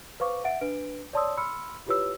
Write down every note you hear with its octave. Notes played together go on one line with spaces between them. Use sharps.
B4 C5 F5 C#6 D6
E5 F#5 A6 D7
D4 B4 D7
C#5 D5 A5 C6 D#6 E6
B5 C6 E6 F6 C#7
E4 F4 G4 B4 C#5 E6